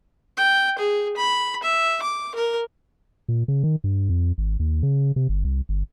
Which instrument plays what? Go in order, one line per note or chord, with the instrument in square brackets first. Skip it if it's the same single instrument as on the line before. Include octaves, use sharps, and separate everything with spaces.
[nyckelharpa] G5
G#4
B5
E5
D6
A#4
[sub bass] A#2
C#3
D#3
G2
F2
G#1
D#2
C#3
C3
G1
C2
G1